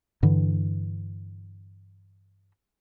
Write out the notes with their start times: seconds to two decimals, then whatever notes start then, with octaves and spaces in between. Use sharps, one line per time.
0.23 G2 D3 E3